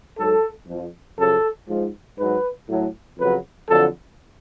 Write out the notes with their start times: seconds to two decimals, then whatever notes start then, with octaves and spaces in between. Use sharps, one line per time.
0.18 G#2 F#3 A4
0.68 F2 F3
1.18 F#2 C#3 F3 A4
1.69 G#2 F3
2.18 G#2 F#3 B4
2.68 A2 F#3
3.18 F2 C#3 F#3 B4
3.69 F2 D3 F#3 A4